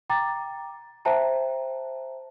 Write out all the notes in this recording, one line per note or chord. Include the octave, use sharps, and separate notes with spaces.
G5 A#5 D6 A6
C5 E5 G5 A5 A#5